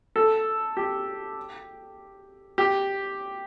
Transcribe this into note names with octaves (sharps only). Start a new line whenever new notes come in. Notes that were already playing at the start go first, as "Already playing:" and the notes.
A4
G4
G4